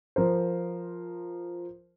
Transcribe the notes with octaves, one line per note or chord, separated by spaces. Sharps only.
F3 A#4 C5